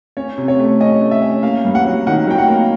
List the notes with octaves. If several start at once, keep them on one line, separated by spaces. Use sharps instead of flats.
C#4 C#5
C3
C#5
A3
C#4 D#5
A3
E5
C#4
A#3 F5
G2
F#5
F#3
D#3 F#5
F#3 G5
F#5
A#3